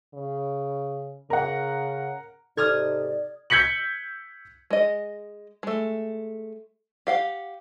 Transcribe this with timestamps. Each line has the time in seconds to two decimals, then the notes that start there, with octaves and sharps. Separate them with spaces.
0.14 C#3
1.30 C#3 A#4 F#5
2.57 G#2 C3 D#4 A4 D5 D#6 F6 G#6
3.50 E6 G6 G#6 B6 C#7 F#7
4.71 G#3 D#5
5.63 G#3 A3
7.07 G4 F5 F#5